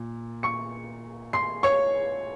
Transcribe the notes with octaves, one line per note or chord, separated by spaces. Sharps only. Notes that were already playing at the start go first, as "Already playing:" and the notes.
Already playing: A#2
C#6 C#7
C6 C7
C#5 C#6